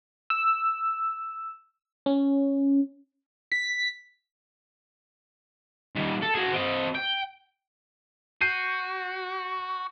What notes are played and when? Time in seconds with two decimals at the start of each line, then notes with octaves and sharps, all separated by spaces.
0.30 E6
2.06 C#4
3.52 B6
5.95 D#3 G3
6.22 A4
6.35 F#4 G#4
6.52 C4 D#5
6.95 G5
8.41 F#4 G6 C7 D#7